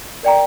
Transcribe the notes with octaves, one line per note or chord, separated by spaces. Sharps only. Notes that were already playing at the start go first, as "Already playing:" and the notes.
A#4 D5 G5 A#5